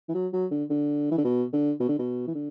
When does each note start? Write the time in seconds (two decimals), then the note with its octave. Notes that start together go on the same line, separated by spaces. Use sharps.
0.08 E3
0.14 F#3
0.33 F#3
0.51 D3
0.70 D3
1.11 E3
1.18 D3
1.24 B2
1.53 D3
1.80 B2
1.88 D3
1.99 B2
2.28 E3
2.35 D3